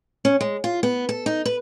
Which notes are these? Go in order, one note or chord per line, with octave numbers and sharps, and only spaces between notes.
C#4
G#3
F4
B3
A4
D#4
B4